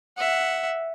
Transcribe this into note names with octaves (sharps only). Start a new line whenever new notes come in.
E5 F#5